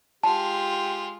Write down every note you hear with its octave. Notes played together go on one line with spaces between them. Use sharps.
G#3 F4 G4 A5